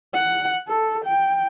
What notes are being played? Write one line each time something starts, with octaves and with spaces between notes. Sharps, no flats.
F#5
A4
G5